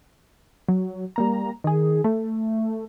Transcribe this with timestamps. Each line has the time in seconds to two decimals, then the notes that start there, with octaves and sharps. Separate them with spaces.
0.68 F#3
1.16 G3 A#3 A#5
1.64 D#3 G#4
2.04 A3